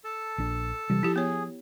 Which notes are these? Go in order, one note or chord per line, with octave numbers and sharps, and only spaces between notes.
A4 A5
A#1 D4
C3 E3 G3
F3 E4 G4
B3 G#4 C#5